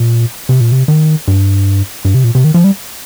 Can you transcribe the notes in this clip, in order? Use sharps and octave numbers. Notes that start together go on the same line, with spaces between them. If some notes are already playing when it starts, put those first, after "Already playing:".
Already playing: A#2
C3
A#2
C3
D#3
G2
G2
C3
A#2
C3
D#3
F3
G3